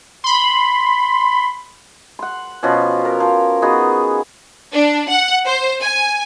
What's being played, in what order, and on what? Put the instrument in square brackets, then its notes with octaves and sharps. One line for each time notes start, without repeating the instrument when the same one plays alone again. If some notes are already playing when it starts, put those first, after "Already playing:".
[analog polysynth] B5 C6
[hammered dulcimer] F#5 C6
B2 F3 C#4
A#4
F3
B3 D#4 F#4 G#4
[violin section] D4
F#5
C5
G#5